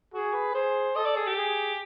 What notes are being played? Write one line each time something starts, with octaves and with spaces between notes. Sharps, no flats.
F#4 G#4
B4
G#4 C5
A4 D#5
D5
G#4
G4
G#4